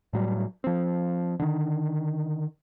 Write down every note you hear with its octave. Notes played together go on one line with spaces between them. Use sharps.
A2 F#3 G3
F3 C4
D3 D#3